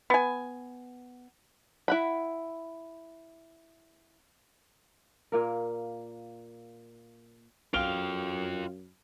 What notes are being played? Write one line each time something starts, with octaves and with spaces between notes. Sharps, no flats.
B3 G#5
E4 F#5 B5
A#2 A#3 A#4
F#2 F4 F5 G5 D7 F7 G7